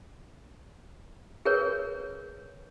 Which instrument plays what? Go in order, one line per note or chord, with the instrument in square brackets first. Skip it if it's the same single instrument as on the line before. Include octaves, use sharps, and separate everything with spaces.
[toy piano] G#4 A#4 B4 C#5